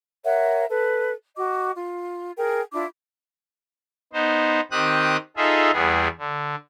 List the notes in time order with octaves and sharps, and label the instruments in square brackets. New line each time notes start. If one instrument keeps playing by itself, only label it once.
[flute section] A#4 C#5 E5 F#5
A4 B4
F#4 D#5 D6
F4
G#4 A#4 G5
D4 E4 F4 D6
[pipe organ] B3 D#4 C5
D#3 C4 G4 D#6 F#6
D#4 F4 G#4 A4 E5
E2 G3 B3 G#4
D3